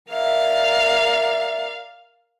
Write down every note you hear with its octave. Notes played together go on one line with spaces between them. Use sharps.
A#4 D5 E5 F5